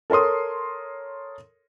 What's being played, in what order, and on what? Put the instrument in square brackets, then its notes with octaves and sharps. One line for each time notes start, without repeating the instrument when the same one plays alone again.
[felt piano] A4 A#4 C#5 C6 D#6